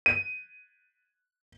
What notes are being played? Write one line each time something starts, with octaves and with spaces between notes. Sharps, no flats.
D#7